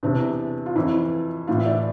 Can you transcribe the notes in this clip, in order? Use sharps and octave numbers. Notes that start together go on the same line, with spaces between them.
E2 C3 E3 D4
F4
F2 E3 E4
A2 E3 F4
E5
D5